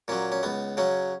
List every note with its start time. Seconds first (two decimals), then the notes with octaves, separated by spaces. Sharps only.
0.08 A#2 F#3 C#4
0.32 C#4
0.43 C#2 B3
0.77 C#3 F#3 C#4